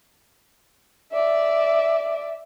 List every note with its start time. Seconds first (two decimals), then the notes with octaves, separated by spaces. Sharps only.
1.12 D5 E5